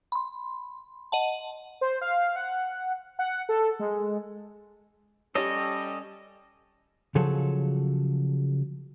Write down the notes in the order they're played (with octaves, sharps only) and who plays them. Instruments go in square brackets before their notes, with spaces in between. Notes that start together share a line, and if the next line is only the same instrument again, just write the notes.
[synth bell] B5 C6
D#5 F#5 A5
[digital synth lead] C5
F5
F#5
F#5
A4
G#3
[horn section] G3 C#4 [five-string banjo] G4 C#5 [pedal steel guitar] A4 D#5
[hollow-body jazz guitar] C#3 F3 F#3 G#4 A4